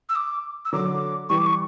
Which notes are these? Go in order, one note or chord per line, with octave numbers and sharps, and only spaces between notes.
E6
D6
E6
D3 F#3 D6
E3 G3 C#6
D6
C#6